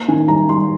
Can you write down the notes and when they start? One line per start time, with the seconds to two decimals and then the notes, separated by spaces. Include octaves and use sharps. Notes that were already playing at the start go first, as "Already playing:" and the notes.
Already playing: A#3
0.08 D#3 G#5
0.28 G3 A#5
0.49 G3 C6